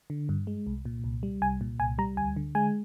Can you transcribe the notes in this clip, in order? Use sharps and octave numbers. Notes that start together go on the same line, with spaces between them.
D3
G2
G#3
C2
A#2
C2
G3
C2 G#5
A#2
C2 G#5
G3 A#5
D2 G#5
D3
G#3 G#5